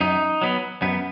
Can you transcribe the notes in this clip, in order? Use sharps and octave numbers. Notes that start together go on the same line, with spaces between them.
F#2 D#4
F#3 B3
F#2 B3